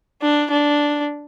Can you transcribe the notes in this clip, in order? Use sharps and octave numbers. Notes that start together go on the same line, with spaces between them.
D4
D4